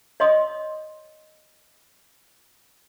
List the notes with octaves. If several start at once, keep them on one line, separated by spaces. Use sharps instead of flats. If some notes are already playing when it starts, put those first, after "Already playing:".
C#5 D#5 C6 D#6